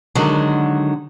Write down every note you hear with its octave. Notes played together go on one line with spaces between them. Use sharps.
D3 D#3 F#3 G#3